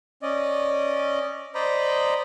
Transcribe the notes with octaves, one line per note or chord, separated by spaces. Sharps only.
C#4 D5 D#5
C5 D5 D#5 A#5 B5